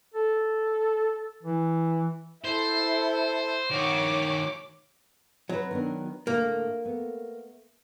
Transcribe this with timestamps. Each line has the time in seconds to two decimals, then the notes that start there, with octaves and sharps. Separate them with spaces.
0.14 A4
1.43 E3
2.44 E4 A4 C5
3.71 D#3 F#4 C#5 D6
5.49 F#3 C4 B4
5.71 D#3 B3 D4
6.27 A2 D3 A3 A#3
6.85 A3 B3